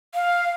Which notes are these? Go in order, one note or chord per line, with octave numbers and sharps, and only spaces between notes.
F5